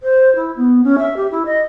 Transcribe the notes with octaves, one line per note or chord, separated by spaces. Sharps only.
C5
E4
B3
C#4
E5
G4
E4
D#5